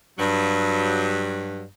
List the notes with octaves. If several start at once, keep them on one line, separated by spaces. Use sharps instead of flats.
G2 F#3